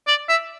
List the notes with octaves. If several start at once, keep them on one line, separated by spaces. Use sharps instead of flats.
D5
E5